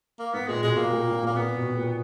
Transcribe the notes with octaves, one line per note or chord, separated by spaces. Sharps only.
A#3
G#2 B3
A#2 G#3
B2 G#3
A#2 A#3
A#2
A#2
A#2
A#3
A#2 B3
B2
A#2